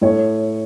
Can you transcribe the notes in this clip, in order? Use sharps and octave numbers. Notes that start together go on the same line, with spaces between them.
A2 C#5